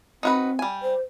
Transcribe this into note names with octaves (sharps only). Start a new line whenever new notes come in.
C4 D#4 F#4 B4
G3 G#5
C5